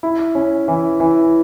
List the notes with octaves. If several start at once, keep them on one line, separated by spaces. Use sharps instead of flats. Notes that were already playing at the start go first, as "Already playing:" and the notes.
E4
C#4
E3
E3